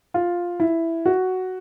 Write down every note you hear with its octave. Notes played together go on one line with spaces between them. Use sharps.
F4
E4
F#4